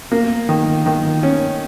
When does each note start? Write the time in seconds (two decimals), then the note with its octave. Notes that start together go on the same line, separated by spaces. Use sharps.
0.12 A#3
0.49 D#3
0.86 D#3
1.23 C#4